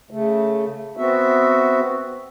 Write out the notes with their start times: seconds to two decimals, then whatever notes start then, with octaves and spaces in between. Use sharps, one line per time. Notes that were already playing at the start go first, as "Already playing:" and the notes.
0.11 C#3 A3
0.97 B3 C4 F#4 E5